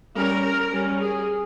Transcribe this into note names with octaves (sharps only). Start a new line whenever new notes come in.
G3 C#4 A#4
G3 C#4
G#4